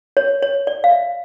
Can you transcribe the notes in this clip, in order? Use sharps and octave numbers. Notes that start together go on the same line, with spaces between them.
C#5
C#5
D5
F5
E5